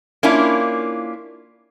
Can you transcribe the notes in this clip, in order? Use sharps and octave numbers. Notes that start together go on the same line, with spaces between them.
A#3 C#4 D4 E4 F4